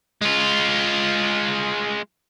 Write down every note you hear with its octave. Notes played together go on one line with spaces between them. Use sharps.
G#3 F4